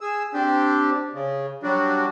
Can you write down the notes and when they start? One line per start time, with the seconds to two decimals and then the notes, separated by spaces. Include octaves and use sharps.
0.01 G#4 E6
0.34 C4 D4 G4
1.13 C#3
1.63 F#3 G3 D4 F#4